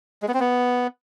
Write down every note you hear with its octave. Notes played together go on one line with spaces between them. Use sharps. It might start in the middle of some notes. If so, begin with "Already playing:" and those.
G#3
B3
C4
B3